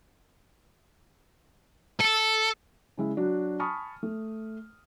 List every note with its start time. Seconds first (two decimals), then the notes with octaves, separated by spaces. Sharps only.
2.01 A4
2.98 C#3 G#3 E4
3.17 F#3 D4 F#4
3.60 G#5 A5 B5 C#6 D#6 F6
4.03 A3